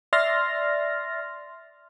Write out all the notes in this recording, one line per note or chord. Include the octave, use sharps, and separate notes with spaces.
D5 E5 C6 F6 A6 A#6